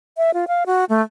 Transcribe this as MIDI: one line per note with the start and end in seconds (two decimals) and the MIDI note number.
0.17 0.31 76
0.34 0.45 65
0.48 0.64 77
0.66 0.85 66
0.89 1.02 57